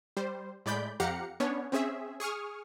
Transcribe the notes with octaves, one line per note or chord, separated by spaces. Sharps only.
G3 C5
A2 G#3 D5 B5 G6
F2 G4 F5 F#5 A#5 C#7
B3 C#4 D4 C#5
C4 C#4 G#4 E5
G#4 C#6 D#6 F6